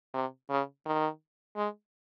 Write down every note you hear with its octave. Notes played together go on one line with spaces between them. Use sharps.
C3
C#3
D#3
G#3